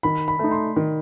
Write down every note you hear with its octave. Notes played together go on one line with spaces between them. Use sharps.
D#3 B5
B5
A3 D#4
C6
D#3